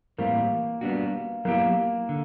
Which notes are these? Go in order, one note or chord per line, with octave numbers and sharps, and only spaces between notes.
A2 E3 G3 A#3 C4
G3 B3 D4 F#4
F#3 A#3 B3 E4 G4
D3